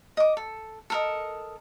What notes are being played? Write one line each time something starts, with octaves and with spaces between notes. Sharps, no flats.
D#5 D6
A4
A4 A#4 D#5